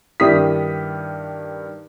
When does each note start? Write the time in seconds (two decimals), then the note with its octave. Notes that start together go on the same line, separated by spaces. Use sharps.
0.20 G2 D#3 E4 G4 D#6 B6